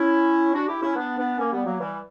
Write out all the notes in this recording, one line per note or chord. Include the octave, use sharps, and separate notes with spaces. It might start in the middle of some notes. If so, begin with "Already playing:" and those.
Already playing: C#4 E4
D4 F#4
E4 G4
C#4 E4
B3 D4
B3 D4
A#3 C#4
G3 B3
F#3 A#3
E3 G3